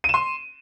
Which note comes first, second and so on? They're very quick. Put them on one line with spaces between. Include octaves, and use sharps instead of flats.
D#7 E7 C6